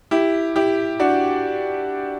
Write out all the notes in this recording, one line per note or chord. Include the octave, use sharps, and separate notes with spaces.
E4 G4
E4 G4
D4 F#4